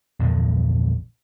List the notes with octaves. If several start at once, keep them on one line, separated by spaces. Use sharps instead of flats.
A#1 E2 G2 D3